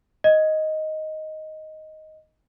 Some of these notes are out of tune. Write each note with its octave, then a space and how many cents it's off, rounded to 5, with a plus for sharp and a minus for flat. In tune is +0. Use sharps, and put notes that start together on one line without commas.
D#5 +5